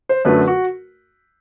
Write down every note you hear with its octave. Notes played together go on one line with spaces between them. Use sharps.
C5
F#2 D3 F#3 A3 B4
F#4